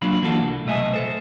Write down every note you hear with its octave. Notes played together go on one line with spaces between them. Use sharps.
F#3 A#3 D4 F4 B5
E3 A#3 D4 F4 F#4 A4
C2
B1 C3 A3 D#5 E5 G#5
A4 C5